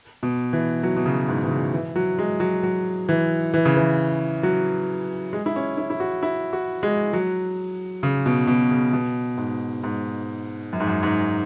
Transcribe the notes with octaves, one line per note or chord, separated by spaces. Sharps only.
B2
E3
F#3
B2
C#3
G#2
E3
C#3
E3
F#3
G#3
F#3
F#3
E3
E3
C#3
E3
F#3
G#3
E4
C#4
E4
E4
F#4
E4
F#4
G#3
F#3
C#3
B2
B2
C#3
B2
G#2
G#2
F#2
G#2
F#2
G#2